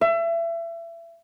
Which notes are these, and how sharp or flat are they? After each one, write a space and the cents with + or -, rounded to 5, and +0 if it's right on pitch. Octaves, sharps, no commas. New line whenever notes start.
E5 +30